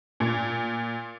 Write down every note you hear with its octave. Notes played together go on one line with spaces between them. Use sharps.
A#2